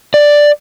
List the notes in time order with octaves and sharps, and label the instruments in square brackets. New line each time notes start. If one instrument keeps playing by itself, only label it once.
[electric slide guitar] D5